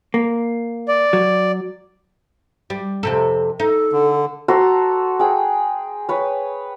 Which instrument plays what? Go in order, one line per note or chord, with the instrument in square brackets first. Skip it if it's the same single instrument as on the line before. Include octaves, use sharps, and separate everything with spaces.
[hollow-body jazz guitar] A#3
[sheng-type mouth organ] D5
[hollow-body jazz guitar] F#3
[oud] G3
F2 C3 A4
[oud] D#4 [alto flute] A4
[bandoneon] D3
[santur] F#4 A4 A#5 C6
G#4 G5
B4 C#5